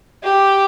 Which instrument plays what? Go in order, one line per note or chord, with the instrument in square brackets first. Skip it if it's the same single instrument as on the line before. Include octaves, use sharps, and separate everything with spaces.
[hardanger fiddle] G4